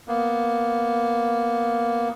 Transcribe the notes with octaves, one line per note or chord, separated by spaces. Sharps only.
A#3 B3